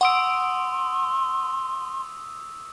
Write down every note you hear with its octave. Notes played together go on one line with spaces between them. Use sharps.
F#5 C6 C#6 D#6 E6 D7